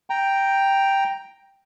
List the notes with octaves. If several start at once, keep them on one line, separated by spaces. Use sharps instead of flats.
G5 A#5